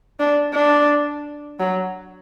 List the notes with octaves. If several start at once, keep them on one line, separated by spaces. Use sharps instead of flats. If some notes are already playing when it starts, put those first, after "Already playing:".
D4
D4
F#3